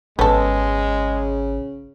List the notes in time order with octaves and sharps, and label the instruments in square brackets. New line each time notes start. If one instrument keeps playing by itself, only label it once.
[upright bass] G#1 [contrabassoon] C#3 [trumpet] G#3 [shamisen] B3 A4